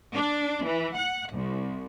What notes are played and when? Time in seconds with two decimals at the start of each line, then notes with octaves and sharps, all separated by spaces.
0.13 D4
0.64 E3
0.96 F#5
1.32 C2